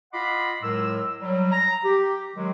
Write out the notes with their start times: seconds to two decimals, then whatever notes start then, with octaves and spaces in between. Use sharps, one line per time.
0.13 F4 D#5 F#5 B5 C6 D6
0.61 A2 F#3 G#3 A#4 E6
1.20 F#3 G3
1.51 A#5
1.83 G4
2.35 D#3 F#3 G#3